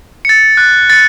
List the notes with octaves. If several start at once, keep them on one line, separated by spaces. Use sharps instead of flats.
A6 C#7
F#6
A6 C#7